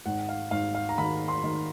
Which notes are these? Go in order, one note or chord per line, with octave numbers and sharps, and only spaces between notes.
G#1 F#5
F5
G#1 F5
F5
A#5
D#3 B5
C6
D#3